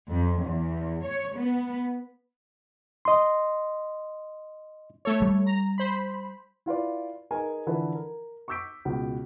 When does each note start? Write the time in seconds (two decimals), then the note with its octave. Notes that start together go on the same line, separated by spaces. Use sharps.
0.10 F2
0.45 E2
1.04 C#5
1.38 B3
3.05 D#5 C6
5.05 A3 A4 C#5
5.22 G3
5.46 A#5
5.78 C5 B5
6.66 E4 F4 B4 D5
7.31 D#4 G#4 A#4 B4 G#5
7.66 D3 E3 F3 E4 A4 B4
7.95 A#4
8.48 C#6 D6 E6 G6 B6 D7
8.85 C#2 B2